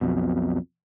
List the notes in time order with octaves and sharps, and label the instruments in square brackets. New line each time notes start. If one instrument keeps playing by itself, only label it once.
[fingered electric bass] B1 F2 B2